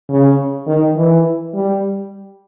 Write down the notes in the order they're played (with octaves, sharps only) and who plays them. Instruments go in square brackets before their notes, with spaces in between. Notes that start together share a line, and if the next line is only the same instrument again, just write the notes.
[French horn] C#3
D#3
E3
G3